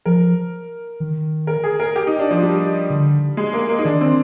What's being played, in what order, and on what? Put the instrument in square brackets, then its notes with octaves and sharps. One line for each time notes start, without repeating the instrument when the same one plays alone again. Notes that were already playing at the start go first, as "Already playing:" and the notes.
[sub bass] F3 [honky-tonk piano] A#4
[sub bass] D#3
[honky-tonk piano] A#4
G#4
A#4
G4
D#4
D4
F3
G3
[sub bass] D3
[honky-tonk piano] G#3
A#3
A#3
D#4
[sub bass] D#3 [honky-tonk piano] D4
[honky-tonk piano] C4